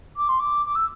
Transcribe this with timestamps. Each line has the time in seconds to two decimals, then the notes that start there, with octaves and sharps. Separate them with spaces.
0.16 D6
0.28 C6
0.39 D6
0.66 D6
0.75 E6